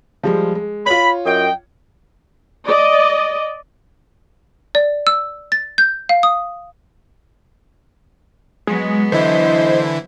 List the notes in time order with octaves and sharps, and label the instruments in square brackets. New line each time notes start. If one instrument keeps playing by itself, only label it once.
[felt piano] F3 G3 G#3
G#3
[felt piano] F4 C#5 [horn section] B5
[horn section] F#2 D#5 G5
[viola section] D5 D#5
[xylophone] D5
E6
A6
G6
F5
D#6
[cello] F#3 B3 [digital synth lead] G#3
[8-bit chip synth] D3 E3 E4 [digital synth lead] C5 [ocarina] D#5